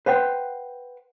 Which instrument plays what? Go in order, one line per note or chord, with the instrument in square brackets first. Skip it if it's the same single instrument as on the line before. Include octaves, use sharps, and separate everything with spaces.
[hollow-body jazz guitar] B4 C5 F#5 G5